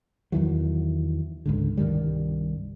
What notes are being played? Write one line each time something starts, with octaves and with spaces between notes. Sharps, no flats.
E2 D#3 E3 F#3
C#2 G#2 D3
C2 G2 D#3 G3